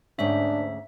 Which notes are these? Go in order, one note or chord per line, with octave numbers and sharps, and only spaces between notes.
D2 G#2 C#4 D4 E5